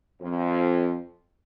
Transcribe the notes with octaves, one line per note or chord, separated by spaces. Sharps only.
F2